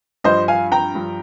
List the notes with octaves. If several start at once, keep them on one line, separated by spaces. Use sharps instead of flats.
G2 F3 C5 D#5
F5 G#5
G5 A#5
G2 F3